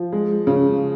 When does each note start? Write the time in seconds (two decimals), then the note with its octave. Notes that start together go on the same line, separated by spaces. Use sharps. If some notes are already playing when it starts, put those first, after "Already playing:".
Already playing: F3
0.13 G#3
0.47 C#3